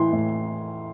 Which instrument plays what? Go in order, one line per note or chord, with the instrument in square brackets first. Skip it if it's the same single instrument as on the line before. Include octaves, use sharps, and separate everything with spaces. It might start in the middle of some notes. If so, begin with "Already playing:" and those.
Already playing: [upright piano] A2 E3 C6
A2